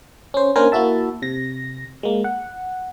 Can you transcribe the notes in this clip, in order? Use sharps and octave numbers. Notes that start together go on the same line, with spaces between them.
C#4 C5
A#3 C#4 D4 A#4 C5 G#5
A#3 E4 F#4 E5 A5
C3 A#6
G#3 A#3
F#5